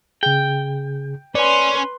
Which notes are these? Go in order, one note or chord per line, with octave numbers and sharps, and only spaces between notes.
C#3 G#4 G5
C#4 B4 D5 G#5 C6